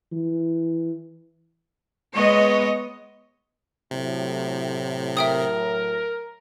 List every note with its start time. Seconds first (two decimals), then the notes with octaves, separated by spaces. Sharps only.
0.12 E3
2.14 G#3 B3 C#5 D#5
3.91 A2 C3 F#3
5.17 A#4 E5 G5 D#6